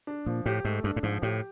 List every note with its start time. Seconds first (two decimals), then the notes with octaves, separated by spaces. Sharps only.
0.07 D4
0.26 A#2 F3
0.46 A2 G4
0.64 G#2 A3
0.83 G2 D4
0.96 A2
1.03 G#2 F3
1.22 A2 G4